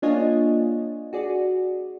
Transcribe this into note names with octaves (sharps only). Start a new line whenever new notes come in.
A#3 D4 F4 C#5 D#5 G#5
F#4 G#4 D5